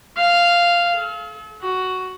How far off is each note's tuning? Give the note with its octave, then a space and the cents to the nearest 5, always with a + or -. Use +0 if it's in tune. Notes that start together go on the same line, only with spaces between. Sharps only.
F5 -5
A4 -45
F#4 +5